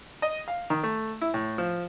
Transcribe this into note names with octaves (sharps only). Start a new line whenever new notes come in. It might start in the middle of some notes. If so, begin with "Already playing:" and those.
D#5
F5
D#3
A3
E4
A2
F3